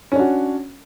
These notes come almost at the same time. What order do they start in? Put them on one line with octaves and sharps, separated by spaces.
C#4 D4 F#4